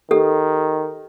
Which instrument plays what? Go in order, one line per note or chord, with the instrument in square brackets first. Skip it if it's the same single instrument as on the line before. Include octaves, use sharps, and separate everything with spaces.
[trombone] D#3 [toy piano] G4 A4